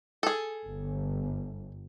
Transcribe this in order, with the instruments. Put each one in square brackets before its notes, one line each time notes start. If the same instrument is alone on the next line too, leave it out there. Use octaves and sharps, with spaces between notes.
[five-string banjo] G#4 A4
[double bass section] G1